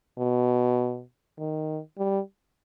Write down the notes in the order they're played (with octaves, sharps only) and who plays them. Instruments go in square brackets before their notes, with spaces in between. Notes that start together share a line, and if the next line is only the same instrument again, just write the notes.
[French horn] B2
D#3
G3